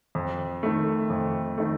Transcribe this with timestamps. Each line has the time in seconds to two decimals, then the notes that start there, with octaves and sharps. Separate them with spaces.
0.15 F2
0.63 D#3 A3
1.10 F2
1.58 D#3 A3